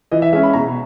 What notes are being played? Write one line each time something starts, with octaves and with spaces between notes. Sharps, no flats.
E3 D#5
E5
G#3 C#4 E5
B5
B2 A#5